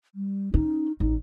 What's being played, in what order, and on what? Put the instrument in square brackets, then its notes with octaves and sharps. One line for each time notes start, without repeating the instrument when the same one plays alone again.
[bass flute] G3
[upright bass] C#4 [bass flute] D#4
[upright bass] A1 [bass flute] D#4